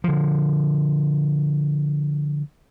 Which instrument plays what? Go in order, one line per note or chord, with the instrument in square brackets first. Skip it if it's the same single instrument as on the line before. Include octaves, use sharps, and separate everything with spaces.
[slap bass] D3 F3